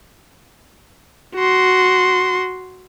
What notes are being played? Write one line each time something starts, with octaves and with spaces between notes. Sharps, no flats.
F#4 C6